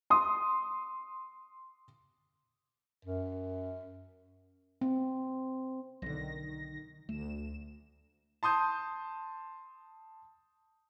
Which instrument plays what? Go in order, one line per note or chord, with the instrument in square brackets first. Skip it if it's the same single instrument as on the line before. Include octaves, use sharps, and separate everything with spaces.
[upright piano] C6 D#6
[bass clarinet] F#2
[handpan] C4
[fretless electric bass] B1 D3 [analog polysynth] D#3 A#6
[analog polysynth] D2 E7 [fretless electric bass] A3
[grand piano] A5 C6 D#6 G6